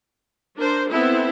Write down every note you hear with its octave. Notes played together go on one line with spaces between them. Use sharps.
D4 A#4 C5
B3 C4 E4 A4